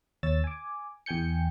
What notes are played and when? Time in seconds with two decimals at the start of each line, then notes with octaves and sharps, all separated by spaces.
0.23 D#2 C#5 E6 A6
0.44 G#5 D6
1.06 E2 G5 G#5 G6 C#7